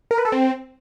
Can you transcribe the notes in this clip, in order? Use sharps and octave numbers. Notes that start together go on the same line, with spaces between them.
A#4
B4
A4
C4